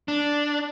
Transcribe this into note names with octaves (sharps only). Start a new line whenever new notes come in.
D4